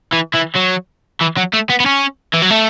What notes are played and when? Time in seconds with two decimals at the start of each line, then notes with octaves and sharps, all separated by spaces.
0.12 E3
0.34 E3
0.55 F#3
1.21 E3
1.37 F#3
1.53 A3
1.70 B3
1.80 B3
1.86 C#4
2.34 E3
2.42 F#3
2.50 A3